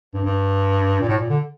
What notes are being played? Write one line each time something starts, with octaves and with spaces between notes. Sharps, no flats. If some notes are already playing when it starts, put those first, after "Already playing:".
G2
G2
A#2
A2
A#2
D3